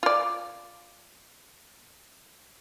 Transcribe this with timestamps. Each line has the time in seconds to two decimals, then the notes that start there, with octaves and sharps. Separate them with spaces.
0.03 F4 D5